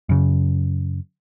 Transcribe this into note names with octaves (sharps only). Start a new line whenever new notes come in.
F#2 C#3